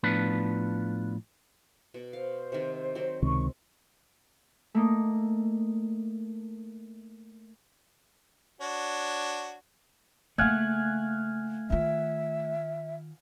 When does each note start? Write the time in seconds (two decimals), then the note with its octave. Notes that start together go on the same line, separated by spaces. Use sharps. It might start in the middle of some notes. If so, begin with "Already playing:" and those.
0.03 A2 F3 B3 D4 F4 B4
1.94 B2
2.13 C5 F5
2.52 C3 D#3
2.95 F#3 C4
3.22 C#2 C3 D#3 C#6
4.75 A3 A#3 D#4
8.61 D4 F#4 C#5
10.38 C#3 A3 A#3 F5 F#5 G#5
11.70 D#3 F4 E5